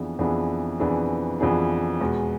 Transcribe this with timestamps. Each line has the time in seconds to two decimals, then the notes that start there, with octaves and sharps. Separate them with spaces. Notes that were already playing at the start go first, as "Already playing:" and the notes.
Already playing: F2 E3 B3 D4 G#4
0.19 F2 E3 B3 D4 G#4
0.80 F2 E3 B3 D4 G#4
1.40 F2 E3 B3 D4 G#4
2.01 E2 B2 G#3